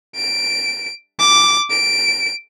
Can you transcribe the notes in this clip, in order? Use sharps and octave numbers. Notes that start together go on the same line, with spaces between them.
D7
D6
D7